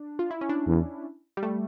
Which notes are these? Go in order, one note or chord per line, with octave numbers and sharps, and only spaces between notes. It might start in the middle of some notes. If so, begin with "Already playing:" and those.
Already playing: D4
F4
E4
C#4
D4
E2
G3
A3